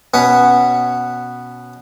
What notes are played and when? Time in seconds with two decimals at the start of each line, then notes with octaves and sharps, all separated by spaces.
0.14 B2 B3 C#4